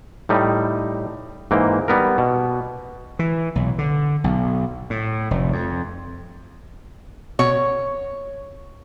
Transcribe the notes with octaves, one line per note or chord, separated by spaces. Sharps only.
A2 G3 D#4
G#2 E3 A#3 G5
G3 B3 A#4
B2
E3
B1
D3
B1
A2
F1
F2
B2 C#5